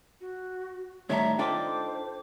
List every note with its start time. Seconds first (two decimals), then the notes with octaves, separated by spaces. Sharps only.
0.21 F#4
1.09 A2 D#3 G3 C#5 D5 E5 A5 A#5
1.39 D4 D#4 F4 A4 C5 G5 D6